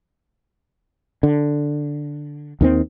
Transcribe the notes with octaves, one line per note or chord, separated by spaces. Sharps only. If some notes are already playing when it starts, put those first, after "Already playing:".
D3
D#2 D#3 C4